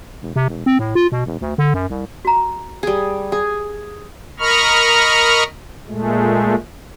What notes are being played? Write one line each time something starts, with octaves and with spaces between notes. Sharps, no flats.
E1
C3
E1
C4
A2
F4
B2
E1
D2
D3
F#2
C2
F#4 A#5
G3 G#4
G#4
A#4 D#5 A#5 B5 C#6 F6
A#2 G#3 A3